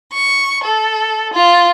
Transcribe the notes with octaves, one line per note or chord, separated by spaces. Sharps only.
C#6
A4
F4